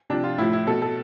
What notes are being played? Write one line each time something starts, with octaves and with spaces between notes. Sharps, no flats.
C3 F3 D4
F4
A2 F3 E4
E4
B2 A4
A4